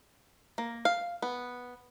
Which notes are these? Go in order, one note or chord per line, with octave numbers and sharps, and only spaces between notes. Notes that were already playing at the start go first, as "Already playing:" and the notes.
A#3
F5
B3